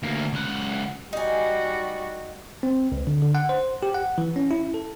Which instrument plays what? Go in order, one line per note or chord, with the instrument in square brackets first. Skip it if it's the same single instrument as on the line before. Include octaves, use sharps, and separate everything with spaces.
[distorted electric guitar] D2 A#3
C#2 F#5
[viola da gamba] G3 F#4 [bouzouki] D#4 G#5
[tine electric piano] C4
C#2
D3
D3
F#5
C5
G4
F#5
E3
C#4
E4
A4